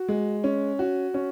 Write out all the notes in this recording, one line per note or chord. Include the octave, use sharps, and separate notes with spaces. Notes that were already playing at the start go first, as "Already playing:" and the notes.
Already playing: F#4
G#3
C#4
F#4
C#4